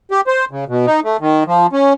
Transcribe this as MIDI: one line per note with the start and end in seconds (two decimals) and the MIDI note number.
0.11 0.21 67
0.27 0.45 72
0.51 0.64 49
0.68 0.86 47
0.86 1.00 63
1.04 1.17 57
1.20 1.44 51
1.47 1.67 53
1.73 1.93 61